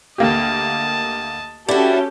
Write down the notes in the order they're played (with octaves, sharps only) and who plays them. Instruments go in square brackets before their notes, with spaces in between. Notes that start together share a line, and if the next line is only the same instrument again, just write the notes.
[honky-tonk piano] D2 A#3 G4 [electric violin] D#5 A5
[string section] C#4 G4 A4 [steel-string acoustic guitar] E4 F#4 [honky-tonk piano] D5